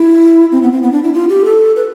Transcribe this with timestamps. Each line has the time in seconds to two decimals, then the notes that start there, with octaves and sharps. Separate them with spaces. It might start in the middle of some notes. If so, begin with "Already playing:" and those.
Already playing: E4
0.52 C4
0.62 B3
0.72 C4
0.82 B3
0.92 D4
1.03 E4
1.13 F4
1.29 G4
1.45 A4
1.76 B4